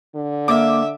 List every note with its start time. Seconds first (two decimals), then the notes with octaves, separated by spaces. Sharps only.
0.15 D3
0.48 A#3 E5 D6